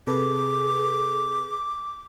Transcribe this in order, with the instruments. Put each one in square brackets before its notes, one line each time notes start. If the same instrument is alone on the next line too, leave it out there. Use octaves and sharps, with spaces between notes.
[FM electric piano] C3 A4 B4 [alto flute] G#4 [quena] D6